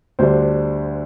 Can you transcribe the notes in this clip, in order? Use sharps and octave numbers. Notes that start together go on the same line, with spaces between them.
D2 D3 G3 D4 C5